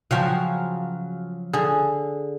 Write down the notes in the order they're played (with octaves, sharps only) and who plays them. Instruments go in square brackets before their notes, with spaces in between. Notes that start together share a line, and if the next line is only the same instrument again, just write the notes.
[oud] C#3 F3 F#3 [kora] F#4 [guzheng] F5 G5
[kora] D3 [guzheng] G#4